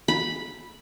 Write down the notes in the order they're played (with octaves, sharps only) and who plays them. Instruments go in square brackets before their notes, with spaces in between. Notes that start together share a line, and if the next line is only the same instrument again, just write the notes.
[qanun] B5